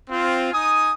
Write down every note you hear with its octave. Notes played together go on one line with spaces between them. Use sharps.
C4 F4
D#4 G#5 D#6